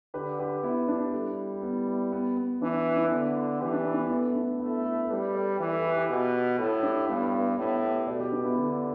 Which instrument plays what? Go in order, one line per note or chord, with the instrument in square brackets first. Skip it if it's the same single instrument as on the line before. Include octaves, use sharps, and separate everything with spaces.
[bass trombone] D3 [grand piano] G4 B4
[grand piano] G4 B4
B3 E4
D4 G4
[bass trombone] G3 [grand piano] E4 A4
[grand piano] B3 E4
B3 E4
B3
B3
[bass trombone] E3 [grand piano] D4
[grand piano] E4
D4
B3 E4
[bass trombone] D3
[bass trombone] E3 [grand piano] G4 B4
[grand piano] D4 G4
B3 E4
D4
B3 E4
[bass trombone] A3 [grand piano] B3
[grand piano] D4
[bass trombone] A3 [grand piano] B3 E4
[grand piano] E4 A4
A4
[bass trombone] G3 [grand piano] G4 B4
[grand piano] A4 D5
[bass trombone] E3
[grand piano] B4
E4 A4
G4 B4
G4 B4
[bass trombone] B2
[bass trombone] A2 [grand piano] E4 A4
[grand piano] D4 G4
[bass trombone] G2 [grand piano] B3 E4
[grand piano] B3
[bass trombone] A2 [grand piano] B3
[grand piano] G4 B4
[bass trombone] B2 [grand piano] A4 D5
[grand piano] G4 B4
D4
B3 E4
[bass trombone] D3 [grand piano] D4 G4